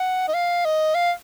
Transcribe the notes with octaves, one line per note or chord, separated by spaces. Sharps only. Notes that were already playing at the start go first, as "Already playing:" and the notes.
Already playing: F#5
D#5
F5
D#5
F5